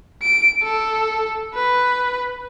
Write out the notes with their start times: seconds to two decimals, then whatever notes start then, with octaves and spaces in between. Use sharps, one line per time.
0.22 D7
0.63 A4
1.55 B4